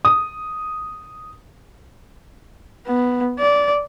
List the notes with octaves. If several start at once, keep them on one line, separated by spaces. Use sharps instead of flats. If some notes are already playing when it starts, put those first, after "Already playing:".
D#6
B3
D5